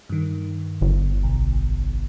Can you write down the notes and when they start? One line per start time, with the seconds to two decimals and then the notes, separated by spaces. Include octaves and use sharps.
0.10 G2 D#3
0.81 G1
1.23 B1